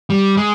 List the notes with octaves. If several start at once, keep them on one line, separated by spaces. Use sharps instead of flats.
G3
G#3